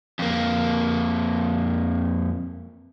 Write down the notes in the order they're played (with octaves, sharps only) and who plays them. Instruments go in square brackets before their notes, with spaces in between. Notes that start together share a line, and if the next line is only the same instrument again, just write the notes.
[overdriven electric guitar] F2 A#3